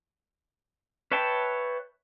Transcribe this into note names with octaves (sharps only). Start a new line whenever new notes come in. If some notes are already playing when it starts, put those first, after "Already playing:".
B4 C#5 E5 G5 A5